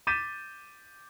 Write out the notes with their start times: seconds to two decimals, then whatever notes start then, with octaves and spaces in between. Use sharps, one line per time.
0.07 D6 G6 A6 B6 D#7 E7